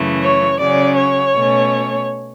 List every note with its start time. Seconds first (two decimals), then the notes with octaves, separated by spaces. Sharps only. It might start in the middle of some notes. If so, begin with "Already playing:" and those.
Already playing: F#2 C#3 E3 A3
0.22 C#5
0.59 C#3 F#3 C#4 D5
0.97 C#5
1.34 B2 A3 C#4